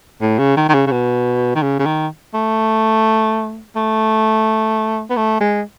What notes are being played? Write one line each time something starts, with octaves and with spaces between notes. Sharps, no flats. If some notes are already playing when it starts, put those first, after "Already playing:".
A2
C#3
D#3
D#3
C#3
C#3
B2
D#3
C#3
C#3
D#3
A3
A3
B3
A3
G#3